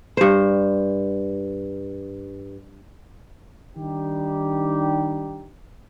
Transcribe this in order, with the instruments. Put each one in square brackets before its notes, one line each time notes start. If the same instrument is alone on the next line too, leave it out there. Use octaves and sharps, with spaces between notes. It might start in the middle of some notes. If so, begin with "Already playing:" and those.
[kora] G2 C5
[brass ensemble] D#3 G3 D4 D#4 G4